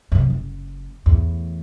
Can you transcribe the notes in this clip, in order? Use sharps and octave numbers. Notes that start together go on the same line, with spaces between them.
F#2 C3
F#1
E2 A2